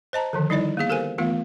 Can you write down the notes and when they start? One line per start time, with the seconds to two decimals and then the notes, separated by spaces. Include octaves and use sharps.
0.13 C5 D#5 A5 A#5
0.33 D3 D#3 F3
0.50 G3 D#4 E4 D5 D#5
0.77 A#3 B3 G#4 F5
0.89 G4 A4 A#4 C5 G#5
1.18 E3 A3 B3 F4 F5